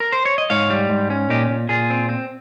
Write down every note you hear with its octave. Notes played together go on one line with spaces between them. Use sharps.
A#4
C5
C#5
D#5
G#2 C#5 F5
G3
G#2
C#4
A#2 D#4 G4
A#2
A#2 F4 G#4
C4
C4